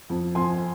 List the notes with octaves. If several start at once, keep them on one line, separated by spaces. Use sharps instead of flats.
F2
F2 G#5 C6